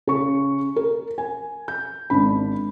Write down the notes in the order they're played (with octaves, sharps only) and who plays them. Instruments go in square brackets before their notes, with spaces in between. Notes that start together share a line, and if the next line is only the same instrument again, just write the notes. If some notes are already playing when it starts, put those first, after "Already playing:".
[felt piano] C#3 C#6
A#4
G#5
G6
G#1 D4 B5